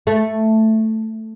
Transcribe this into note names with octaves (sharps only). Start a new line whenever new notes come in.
A3